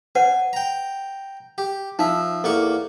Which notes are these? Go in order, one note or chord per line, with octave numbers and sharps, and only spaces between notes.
B4 C#5 F#5 G#5
G5 A#5
G4
F3 D#4 E5
E2 A#3 A4 C#6 D6